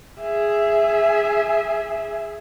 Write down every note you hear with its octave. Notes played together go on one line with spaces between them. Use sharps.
G#4 E5